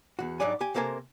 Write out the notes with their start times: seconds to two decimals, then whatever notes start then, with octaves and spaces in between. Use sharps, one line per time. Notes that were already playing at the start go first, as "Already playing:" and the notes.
0.19 E2 F#4
0.40 G#2 F#3 G3 D4 D5 G#5
0.61 G4 G#5
0.74 C3 A#3 A4 A#4 C5 G#5